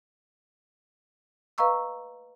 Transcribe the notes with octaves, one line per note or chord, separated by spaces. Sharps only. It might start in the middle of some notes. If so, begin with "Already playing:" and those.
B4 D#5 F5 A#5 C#6 E6